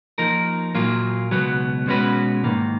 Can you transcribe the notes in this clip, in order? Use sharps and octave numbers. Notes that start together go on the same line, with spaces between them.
F3 A#3 D#4 A#4
A#2 F#3 A#3 F4
C#2 B2 F#3 B3
B2 G#3 C#4 F#4 B4
G#2 D#3 A#3